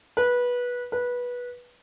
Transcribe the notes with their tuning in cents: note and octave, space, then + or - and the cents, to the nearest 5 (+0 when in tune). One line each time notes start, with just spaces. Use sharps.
B4 -15
B4 -15